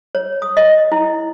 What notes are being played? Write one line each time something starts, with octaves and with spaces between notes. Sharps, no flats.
C#5
D#6
D#5
E4